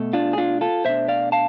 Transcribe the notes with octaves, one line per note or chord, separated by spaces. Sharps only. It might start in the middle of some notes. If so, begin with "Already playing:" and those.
Already playing: B2 A3
D4 F4
G#4
D4 F4
F4 A4
B2 A3 D4 C5 E5
D5 F5
F5 A5